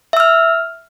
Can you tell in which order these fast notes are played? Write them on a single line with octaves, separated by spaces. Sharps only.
E5 E6 F6